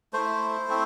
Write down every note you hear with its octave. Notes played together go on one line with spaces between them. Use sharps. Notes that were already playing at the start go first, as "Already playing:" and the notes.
A3 E4 C5
A3 C4 E4